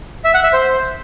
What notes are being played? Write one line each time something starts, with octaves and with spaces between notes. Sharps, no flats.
E5
F#5
E5
C5